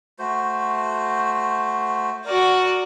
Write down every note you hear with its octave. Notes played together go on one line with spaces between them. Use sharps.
A3 F#4 C5
F#4 A#4 D5